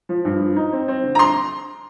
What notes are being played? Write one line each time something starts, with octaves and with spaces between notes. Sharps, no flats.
F3
G2
F3
D#4
C4
C4
D3
A#5
C6